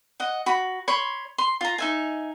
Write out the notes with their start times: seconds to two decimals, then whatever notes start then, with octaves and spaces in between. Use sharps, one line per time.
0.20 D#5 F#5
0.46 F#4 B5
0.88 C#5 B5 C6
1.38 C6
1.61 F4 A#5
1.78 D#4 E5 G#5